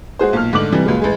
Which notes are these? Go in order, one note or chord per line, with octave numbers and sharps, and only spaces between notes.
G#3 F#4 G#4 C5
B1 A#2 F6
G#2 D3 A3 D6 F#7
C3 E3 G3
C#2 A#2 F#3 G#3
A1 G#3 G#5